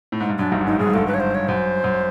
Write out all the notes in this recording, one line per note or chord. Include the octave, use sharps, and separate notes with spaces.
A2
G#2
G2
F#2 D4
G1 G2 D#4
G#1 G#2 D#4
G2 G#4
G#2
G1 G2 A4
B4
C#5
C5
C#5
F#2 C5
F#2